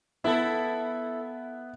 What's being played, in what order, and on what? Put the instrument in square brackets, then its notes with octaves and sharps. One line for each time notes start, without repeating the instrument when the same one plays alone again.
[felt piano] B3 [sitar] E4 A4 [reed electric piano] E5